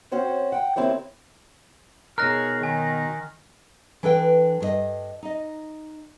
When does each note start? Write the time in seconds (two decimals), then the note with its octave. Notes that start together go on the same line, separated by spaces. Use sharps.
0.12 C4 C#4 F#4 C5 C#5
0.52 F#5 G5
0.76 D#2 A#3 C4 E4 G4 C#5
2.18 B2 D#4 G#4 A#4 C#5 F6 F#6 A#6
2.63 D#3 G#5
4.03 E3 D4 A4 B4 G5
4.60 G2 A#4 D#5
5.23 D#4 D#5